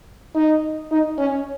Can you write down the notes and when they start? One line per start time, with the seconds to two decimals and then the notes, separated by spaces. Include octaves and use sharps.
0.35 D#4
0.91 D#4
1.18 C#4